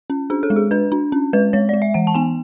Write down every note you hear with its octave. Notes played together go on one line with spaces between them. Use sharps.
C#4
D4 G#4
A4
G#3
G#4
D4 B4
D4
C#4
G#3 B4
G#3 C#5
G#3 D5
E5
E3 F#5
A5
B3 G#5